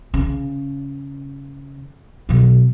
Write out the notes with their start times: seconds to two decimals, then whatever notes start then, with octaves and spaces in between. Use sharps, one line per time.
0.14 C#3
2.29 B2 F#3